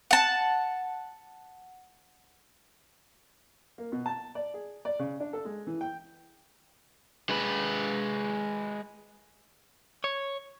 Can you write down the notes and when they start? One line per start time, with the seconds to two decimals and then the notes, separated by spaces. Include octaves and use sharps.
0.11 F#5 A5
3.78 A#3
3.92 B2
4.06 A5
4.35 D5
4.54 G#4
4.85 D5
4.99 C#3
5.20 D4
5.33 A4
5.45 G#3
5.67 E3
5.81 G5
7.29 G#3 B4
10.04 C#5